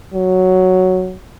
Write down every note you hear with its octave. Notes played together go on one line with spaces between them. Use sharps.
F#3